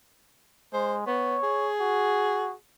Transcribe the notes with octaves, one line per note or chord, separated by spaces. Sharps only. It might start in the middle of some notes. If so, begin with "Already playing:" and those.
G#3 C5
B3 C#5
G#4
F#4